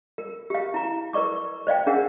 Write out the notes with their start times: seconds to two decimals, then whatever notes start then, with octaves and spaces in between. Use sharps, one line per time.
0.18 A#4
0.50 G4 F5
0.74 E4 A#5
1.13 A#4 B4 D5 C#6 D6
1.67 C5 D5 F5 G5
1.87 D4 G#4 A#4 F5 F#5